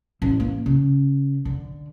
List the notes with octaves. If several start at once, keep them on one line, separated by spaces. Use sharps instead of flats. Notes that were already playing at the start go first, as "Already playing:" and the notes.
A1
A#3
C#3
D3